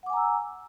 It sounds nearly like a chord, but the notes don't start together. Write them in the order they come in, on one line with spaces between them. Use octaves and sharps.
F#5 D6 G#5 A#5 E6